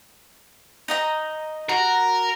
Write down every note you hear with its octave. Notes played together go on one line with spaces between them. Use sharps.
D#4 D#5 A#5
F#4 A#4